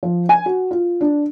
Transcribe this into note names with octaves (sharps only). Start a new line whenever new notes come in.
F3
G#5
F#4
F4
D4